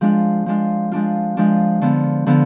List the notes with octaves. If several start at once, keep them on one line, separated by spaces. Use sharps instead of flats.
F3 G#3 D4 F4
F3 G#3 D4 F4
F3 G#3 D4 F4
F3 G#3 D4 F4
D3 F3 B3
D3 F3 B3